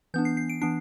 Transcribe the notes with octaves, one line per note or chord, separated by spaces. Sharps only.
E3 B3 D4 G6
C7
C7
D7
E3 B3 D4 C7